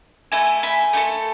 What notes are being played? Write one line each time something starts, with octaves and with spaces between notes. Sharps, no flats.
A3 E4 A4 E5 G#5
G#5 B5
A3 E4 A4